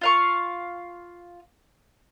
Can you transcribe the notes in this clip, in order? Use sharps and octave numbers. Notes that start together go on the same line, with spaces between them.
F4 F5 C#6